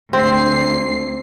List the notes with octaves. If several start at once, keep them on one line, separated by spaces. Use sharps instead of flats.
D2 C4 C7